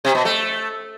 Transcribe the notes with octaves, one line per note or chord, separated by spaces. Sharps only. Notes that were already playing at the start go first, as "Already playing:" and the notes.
C3
B2
A3